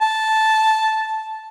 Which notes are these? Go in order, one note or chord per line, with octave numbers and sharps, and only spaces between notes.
A5